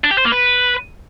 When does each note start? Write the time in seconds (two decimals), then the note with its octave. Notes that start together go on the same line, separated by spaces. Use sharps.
0.04 D4
0.11 G4
0.18 C5
0.25 A#3
0.32 B4